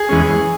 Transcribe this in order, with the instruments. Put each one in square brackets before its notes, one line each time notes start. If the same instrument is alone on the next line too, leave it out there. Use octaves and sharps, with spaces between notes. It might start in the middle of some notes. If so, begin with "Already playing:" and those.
Already playing: [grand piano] G#4
[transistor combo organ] E2 E3 G#3 C#4